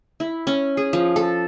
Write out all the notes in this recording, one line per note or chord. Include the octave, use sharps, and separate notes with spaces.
E4
C#4
G#4
F3
A4